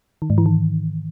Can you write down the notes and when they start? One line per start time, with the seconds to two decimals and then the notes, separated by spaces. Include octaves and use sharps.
0.22 D#3
0.30 G#2
0.38 E3
0.46 D#3